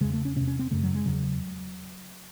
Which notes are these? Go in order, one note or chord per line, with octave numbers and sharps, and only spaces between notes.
E2 C#3 G#3
A3
C#4
E2 C3 C#4
C#4
C4
F#2 C#3 A3
F#3
G#3
E2 C#3 F#3